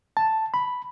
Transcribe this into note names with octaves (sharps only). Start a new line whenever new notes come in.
A5
B5